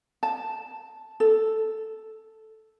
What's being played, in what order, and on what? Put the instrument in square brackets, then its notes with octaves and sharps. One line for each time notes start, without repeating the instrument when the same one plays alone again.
[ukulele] A5
A4